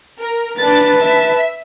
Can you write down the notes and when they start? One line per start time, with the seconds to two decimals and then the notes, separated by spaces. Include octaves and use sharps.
0.19 A#4
0.59 D4 B4 A5 A6
1.01 E5 B6